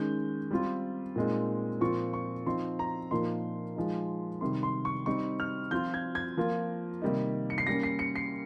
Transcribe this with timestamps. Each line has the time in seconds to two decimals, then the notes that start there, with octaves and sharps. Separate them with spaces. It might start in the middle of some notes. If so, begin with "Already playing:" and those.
Already playing: D#3 G#3 C#4 G6
0.51 G3 C4 F4
1.16 A#2 G#3 C4 D#4
1.81 A#2 F3 C4 F4 C#6
2.13 C#6
2.46 F3 C4 D#4 C6
2.79 A#5
3.11 A#2 F3 A#3 D#4 C6
3.76 F3 G#3 D#4
4.41 C3 D#3 G3 C6
4.63 C6
4.85 C#6
5.06 G3 C4 D#4 C#6
5.40 F6
5.71 F3 C4 F4 G6
5.94 G#6
6.15 G#6
6.37 F3 A#3 F4
7.02 C3 D#3 G3 A#3 D#4
7.50 C#7
7.58 C7
7.66 G3 A#3 C#4 A#6
7.83 C7
7.99 C#7
8.16 C7